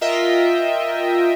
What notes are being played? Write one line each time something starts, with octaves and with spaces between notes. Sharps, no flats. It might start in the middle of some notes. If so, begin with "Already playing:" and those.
F4 A#4 D#5 E5 G5